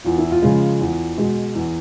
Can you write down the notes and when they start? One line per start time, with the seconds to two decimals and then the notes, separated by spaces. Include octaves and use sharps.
0.05 E2 F4
0.18 E4
0.31 F4
0.42 C#3 F3 G#3
0.81 E2
1.18 B2 G#3
1.55 E2